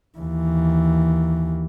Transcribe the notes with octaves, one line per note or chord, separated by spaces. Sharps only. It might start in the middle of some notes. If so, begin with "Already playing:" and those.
D#2 E3